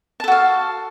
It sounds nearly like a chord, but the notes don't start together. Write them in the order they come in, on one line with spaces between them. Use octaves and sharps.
A5 A4 F#4 F5